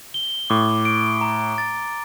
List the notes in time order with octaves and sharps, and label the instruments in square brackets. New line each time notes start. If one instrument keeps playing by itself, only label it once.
[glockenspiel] G7
[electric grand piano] A2 [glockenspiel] D6
[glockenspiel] D7
A#5
A6